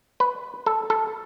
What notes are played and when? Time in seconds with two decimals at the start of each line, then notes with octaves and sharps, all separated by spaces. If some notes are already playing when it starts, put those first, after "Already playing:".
0.20 B4
0.66 A4
0.90 A4